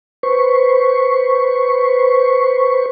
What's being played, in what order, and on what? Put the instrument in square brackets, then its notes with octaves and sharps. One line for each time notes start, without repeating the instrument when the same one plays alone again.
[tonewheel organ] B4 C5 C#6